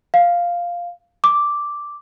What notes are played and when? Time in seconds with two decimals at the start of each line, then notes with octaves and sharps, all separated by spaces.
0.14 F5
1.24 D6